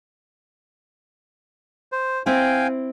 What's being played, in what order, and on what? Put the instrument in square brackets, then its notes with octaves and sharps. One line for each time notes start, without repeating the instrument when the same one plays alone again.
[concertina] C5
[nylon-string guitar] C4 E4 [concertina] F5 G5 G#5